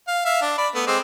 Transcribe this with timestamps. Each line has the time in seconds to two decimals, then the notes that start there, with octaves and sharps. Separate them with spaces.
0.08 F5
0.25 E5 F5
0.42 D4
0.58 D5 B5
0.75 A3 B3
0.87 G#3 C4 D6